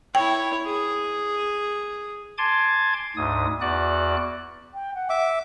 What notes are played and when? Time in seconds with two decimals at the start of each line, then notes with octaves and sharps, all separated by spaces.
0.15 E4 C#5 G5
0.66 G#4
2.38 G#5 A5 C6 D6 G#6
3.17 D2 G#2 D#6
3.61 E2 F#4 D5 F#6
4.74 G5
4.95 F#5
5.10 E5 D6